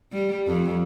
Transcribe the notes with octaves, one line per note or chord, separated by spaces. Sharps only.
G3
F2